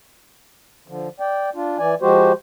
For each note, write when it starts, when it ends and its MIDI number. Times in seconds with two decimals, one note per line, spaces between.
0.88 1.09 50
0.88 1.09 53
1.20 1.50 74
1.20 1.50 79
1.55 1.78 62
1.55 1.78 65
1.79 1.95 52
1.79 1.95 74
1.79 1.95 80
2.01 2.32 53
2.01 2.32 56
2.01 2.32 66
2.01 2.32 67
2.01 2.32 72